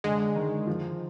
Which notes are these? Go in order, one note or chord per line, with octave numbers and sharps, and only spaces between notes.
D3 G#3
D#3
F3